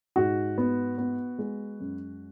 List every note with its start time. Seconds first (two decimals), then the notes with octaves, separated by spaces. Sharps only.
0.16 G#2 F#4
0.58 B3
0.98 B3
1.39 G#3
1.80 F#2